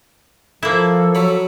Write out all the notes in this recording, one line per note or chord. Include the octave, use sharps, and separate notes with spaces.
F3 A#3 E4 A4
F#3 C#5 B5